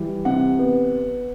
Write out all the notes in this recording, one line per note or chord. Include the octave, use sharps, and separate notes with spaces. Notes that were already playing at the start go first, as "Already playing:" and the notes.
Already playing: E3 G3
C3 F#5
B3